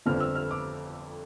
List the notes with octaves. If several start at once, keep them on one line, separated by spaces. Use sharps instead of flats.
G1 F2 D3 F3 F6
E6
F6
D6